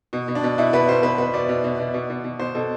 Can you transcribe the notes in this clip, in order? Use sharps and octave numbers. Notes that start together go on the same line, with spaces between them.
B2
B2
D4
B2
B2 E4
B2 B4
B2 C5
B2 B4
B2 B4
B2 D5
B2
B2
B2
B2
B2
B2
B2 C5
B2 A4